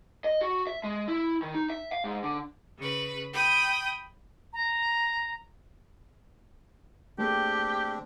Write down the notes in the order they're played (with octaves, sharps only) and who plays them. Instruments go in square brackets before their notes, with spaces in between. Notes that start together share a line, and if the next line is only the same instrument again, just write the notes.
[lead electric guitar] D#5
F#4
E5
G#3
E4
D#3
D#4
E5
F5
G#2
D3
[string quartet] C#3 B4
G5 B5 D#6
[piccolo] A#5
[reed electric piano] A3 A#3 G#4 [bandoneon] C4 D4 [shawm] G4